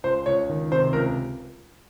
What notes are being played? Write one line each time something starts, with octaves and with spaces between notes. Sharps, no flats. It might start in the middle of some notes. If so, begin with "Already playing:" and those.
C#2 C5
C#2 C#5
D#3
C3 C5
C#2 A#4